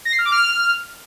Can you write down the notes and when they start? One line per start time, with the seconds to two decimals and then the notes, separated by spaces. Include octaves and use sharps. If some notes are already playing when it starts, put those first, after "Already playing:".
0.05 A#6
0.12 C7
0.19 F6
0.25 D6
0.32 F6